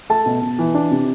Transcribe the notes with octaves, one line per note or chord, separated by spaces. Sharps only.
A3 A5
B2
B2
E3
D4
C3